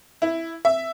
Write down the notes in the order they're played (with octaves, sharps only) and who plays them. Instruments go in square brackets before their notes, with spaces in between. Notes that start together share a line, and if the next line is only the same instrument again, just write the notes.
[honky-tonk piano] E4
E5